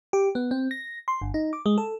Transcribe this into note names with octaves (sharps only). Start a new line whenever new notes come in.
G4
B3
C4
A#6
C6
G1
D#4
D6
G#3
A4